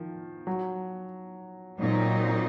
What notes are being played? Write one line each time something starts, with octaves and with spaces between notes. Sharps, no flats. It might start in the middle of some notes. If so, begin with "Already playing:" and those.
Already playing: D#3 F3
F#3
A#2 F#3 C4 D#4